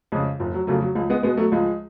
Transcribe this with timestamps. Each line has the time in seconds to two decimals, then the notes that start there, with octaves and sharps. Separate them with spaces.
0.12 F2 C#3 F3 G#3
0.40 F1 F3
0.54 F#3
0.67 F2 C#3 F#3 A3
0.82 F#3
0.95 C#2 F3 G#3
1.10 G#3 B3
1.23 B2 G#3 B3
1.37 F#3 A3
1.52 C#2 F3 G#3